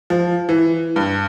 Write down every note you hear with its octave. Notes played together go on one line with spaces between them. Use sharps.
F3
E3
G2